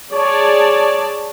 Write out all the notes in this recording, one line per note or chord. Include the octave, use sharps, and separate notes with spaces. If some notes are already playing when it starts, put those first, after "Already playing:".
G#4 C#5 D5 A5